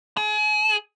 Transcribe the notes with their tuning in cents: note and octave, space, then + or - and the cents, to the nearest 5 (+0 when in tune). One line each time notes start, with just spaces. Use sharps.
G#4 +35